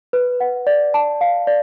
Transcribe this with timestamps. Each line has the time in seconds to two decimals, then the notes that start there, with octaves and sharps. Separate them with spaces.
0.13 B4
0.40 F#5
0.67 D5
0.94 A5
1.21 F5
1.47 D5